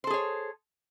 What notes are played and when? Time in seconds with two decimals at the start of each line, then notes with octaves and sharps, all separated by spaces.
0.04 C5
0.07 A4
0.10 G#4
0.14 C#5